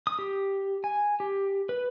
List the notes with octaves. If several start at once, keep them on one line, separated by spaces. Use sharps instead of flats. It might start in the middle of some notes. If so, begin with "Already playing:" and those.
D#6
G4
G#5
G4
B4